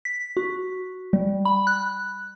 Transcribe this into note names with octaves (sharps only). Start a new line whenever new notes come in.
B6
F#4
G3
B5
F#6